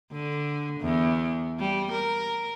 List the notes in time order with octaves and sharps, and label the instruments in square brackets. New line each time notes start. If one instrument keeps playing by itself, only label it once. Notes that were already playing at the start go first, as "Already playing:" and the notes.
[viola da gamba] D3
E2
G3
A#4